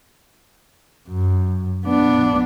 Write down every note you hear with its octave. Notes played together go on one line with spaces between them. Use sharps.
F#2
B3 D4